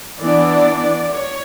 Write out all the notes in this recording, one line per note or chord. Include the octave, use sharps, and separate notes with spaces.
E3 B3 D4 D5
C#5